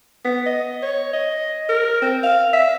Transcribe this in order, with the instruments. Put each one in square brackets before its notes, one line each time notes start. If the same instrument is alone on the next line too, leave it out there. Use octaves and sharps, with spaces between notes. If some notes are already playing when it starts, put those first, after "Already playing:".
[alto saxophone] B3
D#5
C#5
D#5
A#4
C4
F5
E5